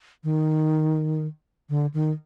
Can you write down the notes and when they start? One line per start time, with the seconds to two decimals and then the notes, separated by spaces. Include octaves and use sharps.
0.24 D#3
1.69 D3
1.94 D#3